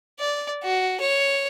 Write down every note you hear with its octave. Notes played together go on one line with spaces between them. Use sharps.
D5
F#4
C#5